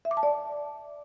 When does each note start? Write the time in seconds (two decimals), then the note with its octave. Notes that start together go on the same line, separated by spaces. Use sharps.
0.05 E5
0.11 D6
0.17 A5
0.23 D5